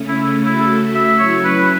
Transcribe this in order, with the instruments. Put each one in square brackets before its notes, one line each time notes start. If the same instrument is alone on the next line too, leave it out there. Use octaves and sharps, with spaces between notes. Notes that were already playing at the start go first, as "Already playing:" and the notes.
Already playing: [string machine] C#3 A3 C#4
[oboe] E4
[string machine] C#3 A3 F#4 A4 [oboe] E4
[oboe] E5
[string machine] F#3 C#4 E4 [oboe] C#5
[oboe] B4